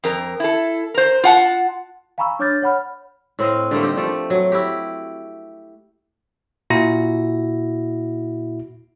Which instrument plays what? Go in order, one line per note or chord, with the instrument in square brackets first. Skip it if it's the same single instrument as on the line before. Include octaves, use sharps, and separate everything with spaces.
[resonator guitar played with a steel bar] F2 A#4
E4 A4
A#4 C5
F4 F#5 A5
[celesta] F5 G#5 A#5 B5 C#6 E6
D4 C#5 D6 F6 G6 A6
C#5 F#5 B5 F6
[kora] A2 C4 D#5 F5
D3 G3 A3 A#3
D#4 G4
F3 A3 D5
F#3
E4 F#4 G4
[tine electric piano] A#2 E4 F#4 A#6